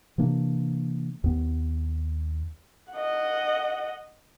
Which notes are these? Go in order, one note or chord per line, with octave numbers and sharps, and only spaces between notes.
C3 E3 A#3 D4
D#2 B3
D#5 F#5